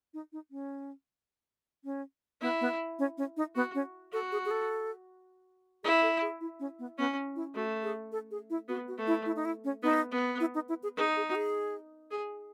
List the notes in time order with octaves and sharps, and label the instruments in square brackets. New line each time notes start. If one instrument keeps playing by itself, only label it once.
[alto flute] D#4
D#4
C#4
C#4
[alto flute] B3 [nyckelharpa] E4
[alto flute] B3
C#4
C#4
D#4
[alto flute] B3 [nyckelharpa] F#4
[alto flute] C#4
[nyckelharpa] F#4 [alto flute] A4
[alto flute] G#4
G#4
A4
[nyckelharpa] E4 [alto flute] G#4
[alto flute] A4
G#4
E4
C#4
B3
[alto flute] B3 [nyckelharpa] C#4
[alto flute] E4
[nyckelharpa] A3 [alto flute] F#4
[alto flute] G#4
A4
G#4
E4
[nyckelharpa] B3 [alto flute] F#4
[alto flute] F#4
[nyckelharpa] A3
[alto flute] E4
E4
D#4
E4
C#4
[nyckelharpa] B3 [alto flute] D#4
[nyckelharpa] B3
[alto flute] E4
D#4
E4
G#4
[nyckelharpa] D#4 [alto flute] G#4
[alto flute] G#4
F#4
G#4
[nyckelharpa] G#4